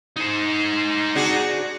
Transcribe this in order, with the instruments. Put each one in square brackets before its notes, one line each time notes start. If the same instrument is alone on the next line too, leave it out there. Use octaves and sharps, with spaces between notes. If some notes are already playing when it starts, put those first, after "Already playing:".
[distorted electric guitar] D#4 C5
[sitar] D4 F#4 G#4